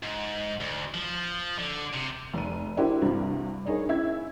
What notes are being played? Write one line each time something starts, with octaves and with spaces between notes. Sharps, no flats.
G#2
D2
F3
D3
C3
F1 D#7
D4 E4 F#4 G4 A#4 C5
C2 G2 C3 F#4
D4 D#4 G#4 A#4 C#5
C#4 E4 E5 G#6